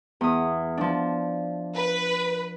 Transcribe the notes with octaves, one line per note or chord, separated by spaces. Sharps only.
E2 D#6
F3 D4
B4